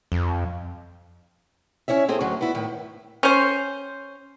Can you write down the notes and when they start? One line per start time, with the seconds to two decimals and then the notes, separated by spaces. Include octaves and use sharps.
0.12 F2
1.88 C#4 E4 C#5 E5
2.08 C4 G#4 A4
2.21 D2 F#3
2.41 B3 E4
2.54 A2 D#3
3.23 C#4 C5